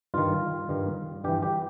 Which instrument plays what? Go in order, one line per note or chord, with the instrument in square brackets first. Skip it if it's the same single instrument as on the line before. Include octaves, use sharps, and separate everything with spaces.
[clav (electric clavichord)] G2 D#3 F4
G2 D#3
G2 E3 G4
G4